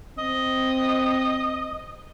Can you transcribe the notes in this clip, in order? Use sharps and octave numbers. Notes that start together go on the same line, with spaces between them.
C4 D#5